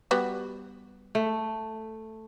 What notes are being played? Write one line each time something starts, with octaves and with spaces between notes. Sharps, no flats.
G3 B3 F#4
A3